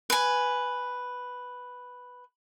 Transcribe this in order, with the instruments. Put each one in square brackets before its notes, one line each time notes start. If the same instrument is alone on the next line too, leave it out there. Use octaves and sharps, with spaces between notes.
[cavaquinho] B4 G#5